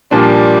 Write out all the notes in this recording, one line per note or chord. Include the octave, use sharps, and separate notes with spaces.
A#2 F3 G3 A#3 D4